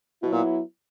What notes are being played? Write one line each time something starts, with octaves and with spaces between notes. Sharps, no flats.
B2 F#3 B3 E4
A#2